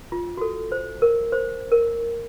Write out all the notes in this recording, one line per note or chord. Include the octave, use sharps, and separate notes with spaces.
F4
F#4
A4
C5
A#4
C5
A#4